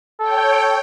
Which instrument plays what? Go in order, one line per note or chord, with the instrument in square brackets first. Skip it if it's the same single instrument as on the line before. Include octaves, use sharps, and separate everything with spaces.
[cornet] A4 [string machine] C#5 G5